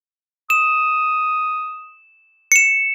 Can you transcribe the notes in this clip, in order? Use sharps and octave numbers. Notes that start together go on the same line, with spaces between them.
D#6 E7
C#7 E7